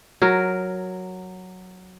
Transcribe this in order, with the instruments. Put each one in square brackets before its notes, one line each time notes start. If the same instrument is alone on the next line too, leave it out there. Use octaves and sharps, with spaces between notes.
[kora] F#3 A#4